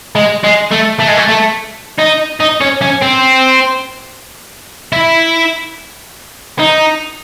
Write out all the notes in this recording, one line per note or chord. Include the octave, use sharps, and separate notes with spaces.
G#3
G#3
A3
A3
G#3
A3
A3
D#4
D#4
C#4
C#4
C4
E4
D#4